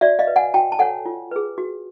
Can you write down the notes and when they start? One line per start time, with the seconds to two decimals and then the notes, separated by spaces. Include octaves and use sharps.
0.01 F#4 D5 E5
0.19 D#5 F5
0.27 B4
0.36 F#5 G#5
0.54 F#4 G5 A5
0.72 A5
0.79 A4 C#5 F#5 G#5
1.06 F4
1.31 G#4 B4
1.58 F#4